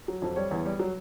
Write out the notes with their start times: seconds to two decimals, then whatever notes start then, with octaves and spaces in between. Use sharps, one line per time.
0.08 F#3
0.22 F2
0.36 G3 C#5
0.51 E2
0.66 G3
0.79 F#3